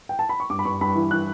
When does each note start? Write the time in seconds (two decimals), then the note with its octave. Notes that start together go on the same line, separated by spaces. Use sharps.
0.09 G5
0.19 A5
0.29 B5
0.40 C#6
0.50 G2 D6
0.59 B5
0.65 G2 C#6
0.81 G2 B5
0.95 E3
1.11 E3 F#6